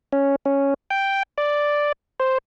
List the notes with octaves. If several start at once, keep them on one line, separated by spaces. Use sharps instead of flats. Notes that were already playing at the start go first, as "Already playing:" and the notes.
C#4
C#4
G5
D5
C5